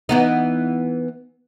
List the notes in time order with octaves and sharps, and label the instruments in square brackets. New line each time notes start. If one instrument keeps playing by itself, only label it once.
[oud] E3 B3 D#4